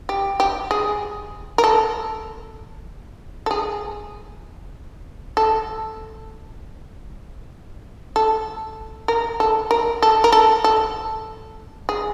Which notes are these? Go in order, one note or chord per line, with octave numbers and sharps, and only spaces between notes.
G4
G4
G#4
A#4
A4
A4
G#4
A4
A4
A#4
A4
A#4
A4
A#4
A4
A4
G#4